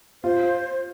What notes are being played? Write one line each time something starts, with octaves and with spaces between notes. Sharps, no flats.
F4 C5